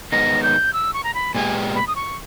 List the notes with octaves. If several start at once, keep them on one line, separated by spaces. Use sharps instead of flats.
D#3 G#3 B3 D#4 A#6
G6
E6
C#6
A#5
B5
A#2 G#3 B3 G4 G#5
B5
D#6
C#6